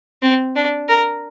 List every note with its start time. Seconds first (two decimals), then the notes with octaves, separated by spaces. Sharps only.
0.22 C4
0.56 D4
0.89 A#4